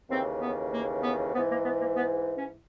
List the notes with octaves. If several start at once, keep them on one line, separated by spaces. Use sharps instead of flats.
D#2 C#3 E3 C4
B3
A#3
B3
G#2 E3 B3
A#3
B3
A#3
B3
C#4